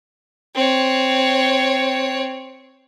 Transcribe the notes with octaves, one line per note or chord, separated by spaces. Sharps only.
C4 C#5